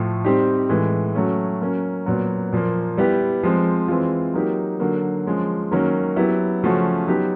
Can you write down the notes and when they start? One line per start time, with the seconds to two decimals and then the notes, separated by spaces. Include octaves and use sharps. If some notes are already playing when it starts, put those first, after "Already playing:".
Already playing: A2 F3 A3
0.24 G3 C4 D#4 G4
0.69 A2 E3 G#3
1.15 F#3 A3 C#4
1.61 F#3 A#3 C#4
2.06 A#2 F#3 B3
2.52 A#2 F3 A#3
2.97 G3 B3 E4 G4
3.43 F3 G#3 C4
3.88 E3 G#3 C4 F4
4.34 F#3 A#3 D#4 G4
4.80 D3 F#3 A#3
5.26 F3 G#3 C#4
5.71 D#3 F#3 A#3 C#4
6.16 F#3 B3 E4 G4
6.63 C#3 F3 A3 C#4 F#4
7.07 F#3 B3 D#4 G4